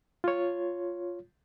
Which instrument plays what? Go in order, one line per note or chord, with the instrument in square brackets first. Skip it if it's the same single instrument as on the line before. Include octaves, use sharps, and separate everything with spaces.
[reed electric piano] F4 C#5